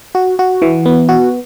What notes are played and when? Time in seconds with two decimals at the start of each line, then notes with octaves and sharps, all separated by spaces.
0.15 F#4
0.39 F#4
0.62 E3
0.86 B3
1.09 F#4